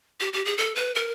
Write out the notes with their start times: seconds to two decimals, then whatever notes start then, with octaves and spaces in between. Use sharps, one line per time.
0.20 G4
0.33 G4
0.45 G#4
0.58 A4
0.76 B4
0.95 A#4